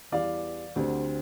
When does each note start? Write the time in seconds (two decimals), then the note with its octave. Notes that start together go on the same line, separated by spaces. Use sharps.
0.12 E2 E3 G3 D5 F5
0.76 D2 D3 G3 C4